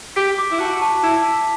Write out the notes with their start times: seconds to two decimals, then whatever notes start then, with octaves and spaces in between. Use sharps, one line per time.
0.16 G4 B6
0.38 D6
0.51 E4
0.60 F#4 A5
0.82 A5
1.04 E4 A5
1.26 B6